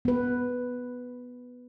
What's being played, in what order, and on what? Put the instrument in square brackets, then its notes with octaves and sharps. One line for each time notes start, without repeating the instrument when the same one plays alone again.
[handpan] B3 B4